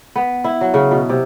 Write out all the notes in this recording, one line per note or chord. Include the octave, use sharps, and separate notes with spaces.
B3
E4
F#3
C#3
B2
C3